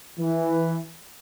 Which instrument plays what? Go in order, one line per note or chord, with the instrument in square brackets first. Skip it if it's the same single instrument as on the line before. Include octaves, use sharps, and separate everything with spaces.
[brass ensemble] E3